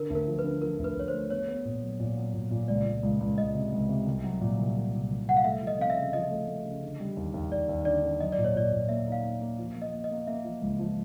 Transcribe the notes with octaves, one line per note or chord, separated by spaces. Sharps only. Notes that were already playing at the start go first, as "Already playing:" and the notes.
Already playing: D3 A#4
D2
A#4
F3
B4
D3
F3 A#4
D2
B4
D2 C#5
C5
A3
B3 C#5
B3
A#2
F#3
A#2
F#3
A#2
A#2
C#2 D5
C#2
C#2
C#2
C#2 D#5
C3
C#2
C3
C2
F#3
A#2
C2
C2
C2
C2
C2 F#5
F5
A3 E5
F3
D#5
C4 F5
E5
C#3
F3 D#5
A3
A3
C#3
D3
G3
D#2
D#2
D#2 D5
D#2
D3 D5
D3
F#3 D#5
D5
A#2
C#5
A#2 D5
A#2
A#3 E5
D#4
F5
A#3
A#3
F3
A#3
D#5
A#3
D#5
A#3
A#3 E5
F3
C#2
F3